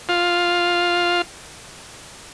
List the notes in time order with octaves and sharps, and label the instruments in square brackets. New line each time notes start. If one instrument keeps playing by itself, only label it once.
[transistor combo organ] F4